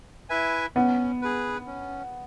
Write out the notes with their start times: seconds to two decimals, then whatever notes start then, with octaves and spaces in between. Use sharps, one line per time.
0.29 E4 B4 E5 G#5
0.75 B3 C#4
1.22 G#4 B4
1.66 C#4